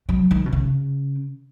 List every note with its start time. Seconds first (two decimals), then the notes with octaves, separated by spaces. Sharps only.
0.09 F#3
0.31 D#3
0.46 B2
0.53 C#3